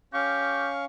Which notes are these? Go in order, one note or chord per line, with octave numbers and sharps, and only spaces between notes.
C#4 G4 F5 C#6